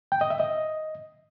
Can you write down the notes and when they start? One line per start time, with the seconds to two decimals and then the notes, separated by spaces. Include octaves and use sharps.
0.12 G5
0.21 D#5
0.30 E5
0.40 D#5